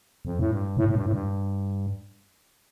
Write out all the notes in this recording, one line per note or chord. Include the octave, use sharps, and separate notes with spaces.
F2
A2
G2
A2
A2
G2
A2
G2